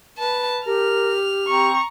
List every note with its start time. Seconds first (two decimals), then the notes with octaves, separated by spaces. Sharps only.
0.18 B4 A5
0.66 G4 A#4 F6
1.48 C4 A#5 C#6